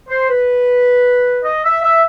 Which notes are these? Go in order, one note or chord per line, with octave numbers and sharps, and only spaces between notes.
C5
B4
D#5
E5
E5